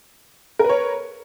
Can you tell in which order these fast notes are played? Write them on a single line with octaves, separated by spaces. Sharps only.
A#4 B4 C#5